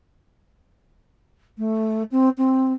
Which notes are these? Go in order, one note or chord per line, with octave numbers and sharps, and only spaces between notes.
A3
C4
C4